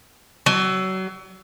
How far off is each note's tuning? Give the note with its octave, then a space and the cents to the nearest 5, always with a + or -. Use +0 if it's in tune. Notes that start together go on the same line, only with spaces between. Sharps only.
F#3 +30